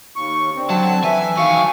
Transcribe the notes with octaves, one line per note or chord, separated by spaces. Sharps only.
D#2 C#6
D3 C4
F#3 A5
E3 E5 G#5
D#3 F#3 F5 C#6